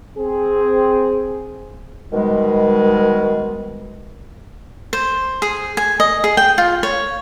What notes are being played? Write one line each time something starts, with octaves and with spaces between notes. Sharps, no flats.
C4 G#4
B2 D#3 G3 G#3
C5
G#4
G#5
D#5
G#4
G5
F4
C#5